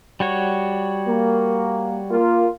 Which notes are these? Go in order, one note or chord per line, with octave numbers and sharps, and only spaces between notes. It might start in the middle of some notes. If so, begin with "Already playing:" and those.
G3 F#4 C#5
A#3
A#3 F4